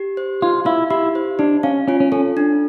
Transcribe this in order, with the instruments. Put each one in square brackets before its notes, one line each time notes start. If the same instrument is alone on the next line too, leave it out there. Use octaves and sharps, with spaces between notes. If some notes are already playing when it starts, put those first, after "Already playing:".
Already playing: [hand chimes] G4
C5
[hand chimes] D#4 [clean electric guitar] F4
[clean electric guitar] E4 [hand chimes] F5
[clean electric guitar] E4 [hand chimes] G4
[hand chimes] C5
[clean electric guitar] D4 [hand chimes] D#4
[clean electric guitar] C#4 [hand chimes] F5
[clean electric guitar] C#4 [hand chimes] F4
[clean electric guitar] C#4
[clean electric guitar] C#4 [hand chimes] A4
[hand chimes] D4